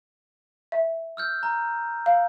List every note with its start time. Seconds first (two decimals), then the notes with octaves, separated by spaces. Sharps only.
0.72 E5
1.17 E6 F6 G6
1.43 A#5
2.06 F5